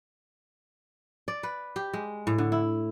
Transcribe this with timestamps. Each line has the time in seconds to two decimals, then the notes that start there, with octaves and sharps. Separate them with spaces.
1.28 D5
1.43 B4
1.76 G4
1.93 G#3
2.27 A2
2.38 D3
2.52 E4